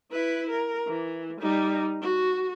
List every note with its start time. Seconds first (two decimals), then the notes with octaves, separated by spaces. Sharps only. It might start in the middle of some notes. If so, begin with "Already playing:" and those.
0.12 E4 B4
0.50 A#4
0.88 E3
1.41 G3 D#4
2.01 F#4